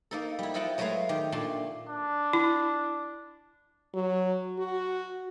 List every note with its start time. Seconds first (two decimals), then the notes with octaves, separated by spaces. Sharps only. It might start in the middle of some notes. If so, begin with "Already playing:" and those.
0.11 A#3 D#4 A4
0.39 G3 E4
0.54 E4 F4 D#5 F#5 G5 A5
0.78 F#3 G#3 A3 G#4 B4 F5
1.09 D#3 G4
1.32 A#2 A3 D4 C6
1.89 D4
2.33 E4
3.94 F#3
4.59 F#4